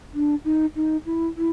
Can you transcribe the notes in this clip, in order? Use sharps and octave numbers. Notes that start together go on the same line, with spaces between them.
D4
D#4
D#4
E4
E4